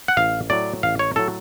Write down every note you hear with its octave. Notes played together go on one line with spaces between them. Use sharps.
F#5
A1 F5
A2 F#3 D5
A1 F5
C#5
A2 F#3 A4